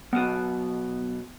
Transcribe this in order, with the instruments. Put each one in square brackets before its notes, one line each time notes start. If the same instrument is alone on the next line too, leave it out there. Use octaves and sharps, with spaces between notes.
[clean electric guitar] B1 B2 [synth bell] B3